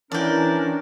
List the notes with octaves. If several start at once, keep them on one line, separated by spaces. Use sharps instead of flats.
E3 C#4 D4 A#4 D5 G5